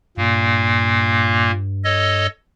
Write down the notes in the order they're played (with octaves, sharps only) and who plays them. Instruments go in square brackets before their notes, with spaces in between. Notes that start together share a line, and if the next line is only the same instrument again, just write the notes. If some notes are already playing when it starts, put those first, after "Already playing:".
[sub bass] G2 [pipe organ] A#2 A#3
[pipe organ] A4 C#5 D#5